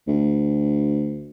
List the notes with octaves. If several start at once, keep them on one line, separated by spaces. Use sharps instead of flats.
D2